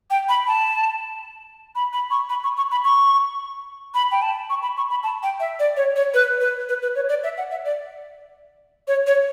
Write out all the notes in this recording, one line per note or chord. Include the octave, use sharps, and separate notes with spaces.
G5
B5
A5
B5
B5
C#6
B5
C#6
C#6
B5
C#6
B5
G5
A5
C#6
B5
C#6
B5
A5
G5
E5
D5
C#5
C#5
B4
B4
B4
B4
C#5
D5
E5
F#5
E5
D5
C#5
C#5